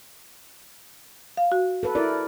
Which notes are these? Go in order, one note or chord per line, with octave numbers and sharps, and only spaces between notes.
F5
F#4
A4 B4
E4 A#4 D5